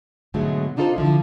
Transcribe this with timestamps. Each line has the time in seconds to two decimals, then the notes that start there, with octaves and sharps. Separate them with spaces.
0.34 G#2 B2 D3 F#3 G#3 A3
0.76 C4 D4 D#4 F4 A4 C5
0.96 D3 F3 E4